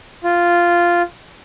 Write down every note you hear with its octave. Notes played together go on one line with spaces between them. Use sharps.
F4